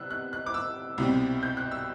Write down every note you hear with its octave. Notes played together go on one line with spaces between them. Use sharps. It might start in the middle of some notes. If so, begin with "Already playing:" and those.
Already playing: C3 G3 B3 E6 F#6
F#6
F#6
D6
E6
C2 B2 G3 C4
G6
F#6
E6